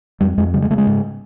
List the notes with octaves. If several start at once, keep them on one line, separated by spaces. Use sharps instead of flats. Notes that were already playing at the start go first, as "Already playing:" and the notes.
F2 G3
F2 G#3
C#3 G3
G#3
C#3 A3
G#3
G#2